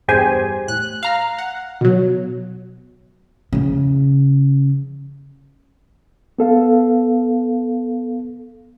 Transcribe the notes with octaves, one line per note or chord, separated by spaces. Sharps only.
E2 G2 G4 G#4 C5 G#5
A2 F#6
F5 A#5 F6
F#5
B2 F#3
E2 C#3
B3 A4 F5